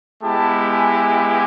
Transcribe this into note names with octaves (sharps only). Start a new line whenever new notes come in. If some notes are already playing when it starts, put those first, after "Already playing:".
G#3 B3 E4 G4 A5
G#5